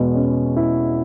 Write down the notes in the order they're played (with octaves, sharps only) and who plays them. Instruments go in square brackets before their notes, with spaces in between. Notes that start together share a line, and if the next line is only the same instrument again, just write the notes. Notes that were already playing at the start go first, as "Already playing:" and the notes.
Already playing: [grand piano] E2 B2 G#3 [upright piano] B3
[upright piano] C#4
E4